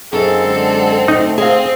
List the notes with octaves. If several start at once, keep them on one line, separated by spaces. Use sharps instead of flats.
F#2 A#3 C4 D#4 G#4 A4
D3 G#3
D2 A3 D#4
C4 G#4 D#5 F5